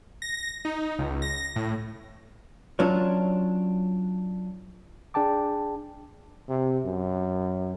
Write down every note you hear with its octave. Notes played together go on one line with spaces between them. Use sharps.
A#6
D#4
C#2
A#6
A2
F#3 C#4 D4 F4 C#5
D4 G#4 G5 A5 D6
C3
F#2